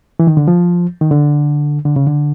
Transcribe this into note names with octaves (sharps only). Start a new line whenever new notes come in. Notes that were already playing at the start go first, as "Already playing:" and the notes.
E3
D#3
D3
F3
D#3
D3
D3
C#3
D3